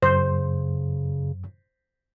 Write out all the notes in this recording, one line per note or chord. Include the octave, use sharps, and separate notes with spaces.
F#2 C#3 C5